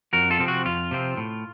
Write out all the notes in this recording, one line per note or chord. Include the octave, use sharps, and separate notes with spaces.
F2 F#4 A#4
F4 A4
C3 F3 C4
F#4
F2 F4
C3 F3 C4
A2